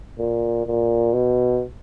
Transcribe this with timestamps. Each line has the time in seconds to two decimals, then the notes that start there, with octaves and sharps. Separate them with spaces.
0.19 A#2
0.67 A#2
1.14 B2